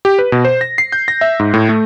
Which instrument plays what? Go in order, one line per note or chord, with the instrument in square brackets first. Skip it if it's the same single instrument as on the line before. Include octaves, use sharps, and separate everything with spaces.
[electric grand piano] G4
B4
B2
C5
A#6
C7
G6
A#6
E5
G#2
A2
A3